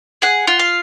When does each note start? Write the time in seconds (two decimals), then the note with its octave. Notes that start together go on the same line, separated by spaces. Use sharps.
0.22 G#4 F#5
0.47 F4
0.59 F5